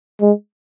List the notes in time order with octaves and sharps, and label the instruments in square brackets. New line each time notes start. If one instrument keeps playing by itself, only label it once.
[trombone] G#3